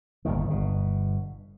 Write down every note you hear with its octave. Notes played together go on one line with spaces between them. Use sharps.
G1 D#2 A2 D#3
G1 B2